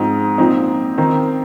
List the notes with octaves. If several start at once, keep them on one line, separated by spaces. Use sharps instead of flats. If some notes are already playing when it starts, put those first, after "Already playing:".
Already playing: G#2 F3 C4 D#4
A#2 F3 C4 D#4
D#3 C4 D#4